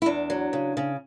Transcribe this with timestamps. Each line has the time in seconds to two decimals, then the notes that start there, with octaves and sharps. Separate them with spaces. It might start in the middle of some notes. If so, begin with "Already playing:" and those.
0.02 E4
0.06 E2 D4
0.30 F#3
0.53 C#3
0.77 C#3